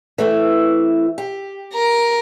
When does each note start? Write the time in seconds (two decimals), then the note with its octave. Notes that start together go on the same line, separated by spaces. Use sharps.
0.18 E3 A3 C4
1.18 G4
1.74 A#4 A#5